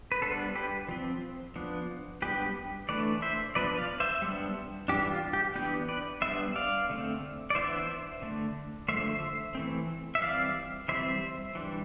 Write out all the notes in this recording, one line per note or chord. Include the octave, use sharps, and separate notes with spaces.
B4
G3 B3 D4 A4 C5
G4 B4
F3 C4
F3 B3 D4
G3 B3 D4 G4 B4
E3 A3 D4 B4 D5
C5 E5
F3 B3 D4 B4 D5
D5 F5
C5 E5
G3 B3 D4
E3 G3 D4 G4
F4
G4
E3 B3 D4 G4
B4 D5
G3 B3 D4 C5 E5
D5 F5
D3 A3 C4
D5
E3 B3 D4 C5 E5
D3 A3 D4
D3 F3 A3 C5 E5
E3 A3 C4
E5
E3 G3 C4 D5 F5
E3 G3 C4 C5 E5
E3 G3 D4